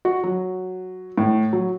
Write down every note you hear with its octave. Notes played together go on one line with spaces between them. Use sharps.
F#4
F#3
A2
F#3